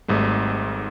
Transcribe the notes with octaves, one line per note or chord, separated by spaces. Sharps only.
G#1 G#2 G3 A3